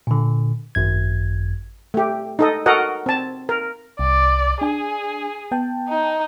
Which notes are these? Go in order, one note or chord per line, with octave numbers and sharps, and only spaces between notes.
A#2 D3
G#1 F#2 G#6
A3 G4
D#4 A4 D#5
F#4 A4 A#4 D#5 F#5
C4 A5
A#4
C2 D5
D4 G#4 G#5
B3 G5 A5
D#4